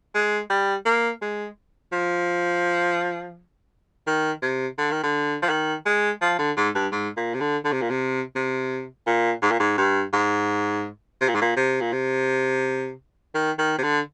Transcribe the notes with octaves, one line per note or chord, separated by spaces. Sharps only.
G#3
G3
A#3
G#3
F3
D#3
C3
D3
D#3
D3
F3
D#3
G#3
F3
D3
G#2
G2
G#2
A#2
C3
D3
D3
C3
A#2
C3
C3
A#2
G#2
A#2
G#2
G2
G#2
C3
A#2
G#2
A#2
C3
A#2
C3
D#3
D#3
C3
D3